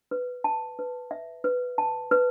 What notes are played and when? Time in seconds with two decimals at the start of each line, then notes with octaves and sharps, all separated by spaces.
0.11 B4
0.44 A5
0.79 B4
1.11 E5
1.44 B4
1.78 A5
2.11 B4